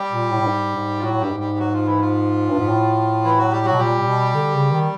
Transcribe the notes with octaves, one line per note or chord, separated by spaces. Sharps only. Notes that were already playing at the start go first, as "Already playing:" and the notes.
Already playing: G3 G4
A#2
A2
A2
G#2
G#2
F4
A2 F#3 F#4
G2 G3 G4
G#2
G3 G4
F#3 F#4
F3 F4
E3 E4
F3 F4
G2
G#2
A2
E3 E4
F#3 F#4
G3 G4
F#3 F#4
B2
A#2 G3 G4
A#2
B2
D3
C#3
D#3